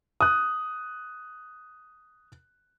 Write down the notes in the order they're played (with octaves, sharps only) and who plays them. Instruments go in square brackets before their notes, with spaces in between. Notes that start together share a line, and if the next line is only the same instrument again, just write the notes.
[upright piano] D#6 F#6